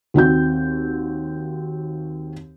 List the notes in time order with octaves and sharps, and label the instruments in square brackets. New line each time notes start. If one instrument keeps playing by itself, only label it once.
[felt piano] D#2 C4 F#4 G6